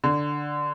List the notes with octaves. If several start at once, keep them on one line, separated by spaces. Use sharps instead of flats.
D3